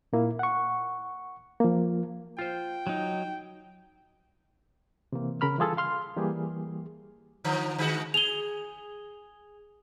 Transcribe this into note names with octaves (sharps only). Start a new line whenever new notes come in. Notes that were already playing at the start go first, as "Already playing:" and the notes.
A#2 A#3 E4
F#5 C#6
F3 A#3
F4 C5 G5
F#3 D#4
C3 E3 A#3 C4
C#3 A#4 B5 F6
E3 G3 F4 G#4 A4
F5 C6 F6
E3 G3 A#3 G4 G#4
D3 F3
D3 G#3 F#4
G#4 F7 G7